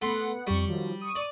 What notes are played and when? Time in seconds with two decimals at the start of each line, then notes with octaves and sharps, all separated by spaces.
0.02 A3 B3 F#5 C6
0.47 F2 G3 C#6
0.67 D#3 F3 F#3
1.01 C#6 D#6 D#7
1.15 D5